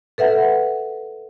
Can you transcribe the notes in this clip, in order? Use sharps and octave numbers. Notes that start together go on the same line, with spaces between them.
A4 B4 E5 F#5